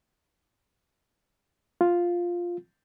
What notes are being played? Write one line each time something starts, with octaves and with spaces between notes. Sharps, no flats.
F4